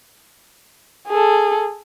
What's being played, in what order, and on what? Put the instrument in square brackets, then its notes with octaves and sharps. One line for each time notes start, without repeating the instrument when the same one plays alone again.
[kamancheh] G#4 A4